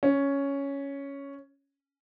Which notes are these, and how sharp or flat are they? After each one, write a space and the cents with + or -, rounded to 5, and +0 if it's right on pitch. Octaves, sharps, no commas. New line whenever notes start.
C#4 +5